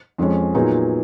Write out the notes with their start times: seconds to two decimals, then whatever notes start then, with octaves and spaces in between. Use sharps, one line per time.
0.18 F2 F3 G#3 C#4
0.54 A#2 F#3 B3 D#4 G#4